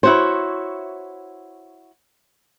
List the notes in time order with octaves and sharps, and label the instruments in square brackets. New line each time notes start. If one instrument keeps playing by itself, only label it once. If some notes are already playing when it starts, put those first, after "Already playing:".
[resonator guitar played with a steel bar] E4 F#4 C#5 [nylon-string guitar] C5